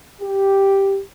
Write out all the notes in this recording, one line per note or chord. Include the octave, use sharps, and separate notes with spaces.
G4